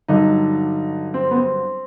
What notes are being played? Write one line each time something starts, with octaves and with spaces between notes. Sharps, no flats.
G2 D3 F#3 D#4
C4
B3
C4